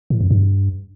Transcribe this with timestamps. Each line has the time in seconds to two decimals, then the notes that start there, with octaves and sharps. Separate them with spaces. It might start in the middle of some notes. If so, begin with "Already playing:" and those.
0.10 A2
0.20 F2
0.31 G2